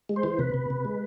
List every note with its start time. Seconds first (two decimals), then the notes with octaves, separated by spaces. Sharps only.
0.09 G#3
0.16 C5
0.23 E3
0.39 C3 B4
0.54 C3
0.70 C3
0.85 G#3